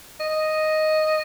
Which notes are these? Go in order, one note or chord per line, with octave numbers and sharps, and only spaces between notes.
D#5